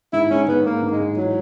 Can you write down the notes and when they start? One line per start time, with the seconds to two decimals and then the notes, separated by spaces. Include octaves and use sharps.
0.13 G#2 E4
0.30 G#2 C#4
0.48 G#2 B3
0.65 G#2 A#3
0.82 G#2
0.91 G#3
1.00 G#2
1.17 E3 F#3